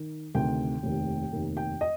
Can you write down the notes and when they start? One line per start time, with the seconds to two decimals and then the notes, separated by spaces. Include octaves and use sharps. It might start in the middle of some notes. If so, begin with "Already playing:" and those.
Already playing: D#3
0.35 D2 C3 D#3 G5
0.83 F1 D#2 D#3
1.32 F1 D#2 D#3
1.57 G5
1.81 D#5